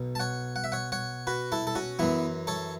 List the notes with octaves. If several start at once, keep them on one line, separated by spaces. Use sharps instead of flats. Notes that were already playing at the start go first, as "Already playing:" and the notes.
Already playing: B1 B2
A5
C#5 F#5
F#5
E5
C#5 F#5
C#5 F#5
F#4 B4
E4 A4
A4
C#4 F#4
F#2 E3 B3 E4
A4 C#5